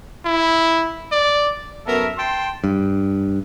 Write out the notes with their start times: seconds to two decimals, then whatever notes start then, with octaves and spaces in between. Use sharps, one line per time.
0.25 E4
1.12 D5
1.87 F#2 B3 A4 A#4 E5
2.18 G5 A5 C6
2.64 G2